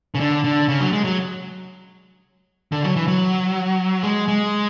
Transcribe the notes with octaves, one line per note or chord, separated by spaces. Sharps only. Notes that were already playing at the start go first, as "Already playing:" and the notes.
C#3
D3
D3
C#3
F#3
G#3
F#3
D3
F#3
E3
F#3
G#3
G#3